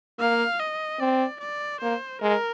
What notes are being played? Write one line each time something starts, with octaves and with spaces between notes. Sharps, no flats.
A#3 F5
D#5
C4 D5
D5
A#3 C5
G#3 A#4